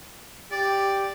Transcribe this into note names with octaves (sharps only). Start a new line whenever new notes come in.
G4 D5